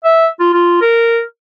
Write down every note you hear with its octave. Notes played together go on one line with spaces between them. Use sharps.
E5
F4
F4
A#4